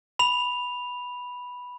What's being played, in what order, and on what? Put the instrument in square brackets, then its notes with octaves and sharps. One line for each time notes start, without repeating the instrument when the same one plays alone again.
[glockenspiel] B5 F7